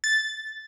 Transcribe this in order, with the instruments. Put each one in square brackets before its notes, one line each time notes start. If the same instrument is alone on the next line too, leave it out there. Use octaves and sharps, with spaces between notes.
[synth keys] A6